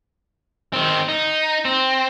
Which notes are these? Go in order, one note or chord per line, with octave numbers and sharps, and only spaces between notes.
D#3 C4
D#4
C4